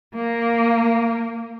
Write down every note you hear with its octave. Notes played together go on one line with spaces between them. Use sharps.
A#3